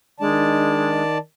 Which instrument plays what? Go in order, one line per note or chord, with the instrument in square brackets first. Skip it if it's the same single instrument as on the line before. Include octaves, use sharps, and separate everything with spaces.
[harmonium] D#3 D5 A5 [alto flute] G#3 [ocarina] D4